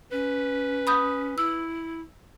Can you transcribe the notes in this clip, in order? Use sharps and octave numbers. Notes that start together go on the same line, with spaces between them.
C#4 B4
B5 D#6 G6
E4 E6